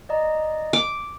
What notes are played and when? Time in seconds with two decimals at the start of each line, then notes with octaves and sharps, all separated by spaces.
0.09 D5 D#5 A#5
0.73 D6